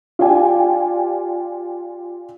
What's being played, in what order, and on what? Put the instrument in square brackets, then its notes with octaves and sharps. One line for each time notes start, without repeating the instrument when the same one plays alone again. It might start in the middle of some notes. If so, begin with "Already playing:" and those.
[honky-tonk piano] F4 G4 D5 G5 G#5